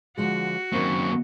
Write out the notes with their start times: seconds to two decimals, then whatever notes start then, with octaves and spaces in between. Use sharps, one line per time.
0.17 D3 F3 G#3 F#4
0.73 F#2 D#3 A#3 C4 C#6